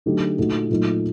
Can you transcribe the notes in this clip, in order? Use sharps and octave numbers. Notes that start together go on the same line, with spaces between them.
D3 F#3 A3 D#4 G4
A#2 A3 D#4 F#4
A#2 F#3 A3 D#4